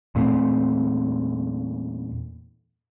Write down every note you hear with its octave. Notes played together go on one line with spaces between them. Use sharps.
E2 A#2 A3 C4